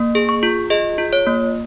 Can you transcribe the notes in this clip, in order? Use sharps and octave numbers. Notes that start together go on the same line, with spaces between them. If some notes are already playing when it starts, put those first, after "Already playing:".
Already playing: A#3
G#4
C#6
F4
G#4 D#5
F4
C#5
A#3